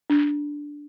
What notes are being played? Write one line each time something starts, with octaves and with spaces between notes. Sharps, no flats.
D4